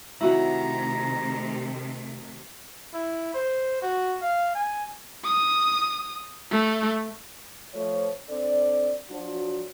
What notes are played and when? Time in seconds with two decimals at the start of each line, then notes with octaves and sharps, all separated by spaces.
0.21 C3 D#3 A3 E4 F#4 F#5 A#5
2.94 E4
3.34 C5
3.82 F#4
4.22 F5
4.55 G#5
5.25 D#6
6.52 A3
7.74 F3 A3 C#5
8.29 C4 D4 A4 D5
9.10 F3 F#3 D4 F#4